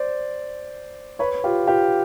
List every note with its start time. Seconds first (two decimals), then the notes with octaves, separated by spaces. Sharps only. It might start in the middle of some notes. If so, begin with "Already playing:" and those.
Already playing: C5 D5
1.19 B4 C#5
1.44 F4 G4
1.67 F4 G4